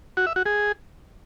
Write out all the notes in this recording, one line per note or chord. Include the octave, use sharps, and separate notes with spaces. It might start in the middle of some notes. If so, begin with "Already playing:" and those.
F#4
E5
F#4
G#4